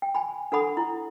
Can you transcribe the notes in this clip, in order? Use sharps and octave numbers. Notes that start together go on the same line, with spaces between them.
G5
G#5 B5
D4 A4 F#5 B5 D#6
E4